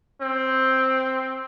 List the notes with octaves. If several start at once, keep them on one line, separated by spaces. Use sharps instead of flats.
C4